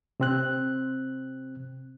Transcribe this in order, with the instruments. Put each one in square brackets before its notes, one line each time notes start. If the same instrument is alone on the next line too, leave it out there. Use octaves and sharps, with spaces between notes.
[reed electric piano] C3 C4 F#6